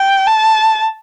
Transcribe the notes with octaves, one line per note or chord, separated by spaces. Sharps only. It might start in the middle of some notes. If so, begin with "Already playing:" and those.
Already playing: G5
A5